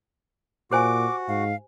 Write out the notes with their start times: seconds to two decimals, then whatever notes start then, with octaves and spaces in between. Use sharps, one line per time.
0.71 A#2 F#4 G4 C5 G#5 D6
1.28 G#2 F5